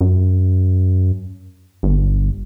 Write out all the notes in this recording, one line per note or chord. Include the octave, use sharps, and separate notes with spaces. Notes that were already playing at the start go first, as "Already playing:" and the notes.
F#2
G1